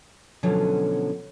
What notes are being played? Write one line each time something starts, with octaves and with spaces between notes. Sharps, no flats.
B2 D3 F3 F#3 C#4